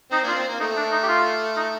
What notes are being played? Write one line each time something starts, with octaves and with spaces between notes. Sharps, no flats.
C4 D#4
A#3 D4 F4
C4
A#3
A3 D#4
D4
D#4
G4
F4
D#4